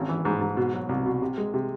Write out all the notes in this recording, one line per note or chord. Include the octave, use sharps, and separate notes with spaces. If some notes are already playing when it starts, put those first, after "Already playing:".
Already playing: G#1 C#4
E3
G#2
G#2
B2
F#3
C2
B2
C3
G#3
C3